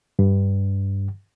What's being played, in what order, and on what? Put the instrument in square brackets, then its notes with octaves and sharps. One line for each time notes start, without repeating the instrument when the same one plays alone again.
[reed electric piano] G2